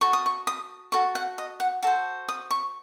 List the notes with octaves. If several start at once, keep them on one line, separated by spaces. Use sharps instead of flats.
F#4 A4 C#6
D#6
C#6
D#6
F#4 A4 C#6
F#5
D#5
F#5
F#4 A4 C5 A5
D#6
C#6